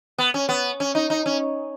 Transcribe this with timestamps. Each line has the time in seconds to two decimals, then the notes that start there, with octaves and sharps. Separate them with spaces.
0.18 B3
0.34 C#4
0.49 B3
0.80 C#4
0.95 D#4
1.10 D#4
1.26 C#4